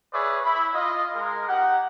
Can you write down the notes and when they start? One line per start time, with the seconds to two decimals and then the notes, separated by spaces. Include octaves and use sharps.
0.12 G#4 B4 C#5 D5 E5
0.44 E4 B5
0.74 F4 D#5
1.14 G#3 A#4
1.48 D#4 G4 F#5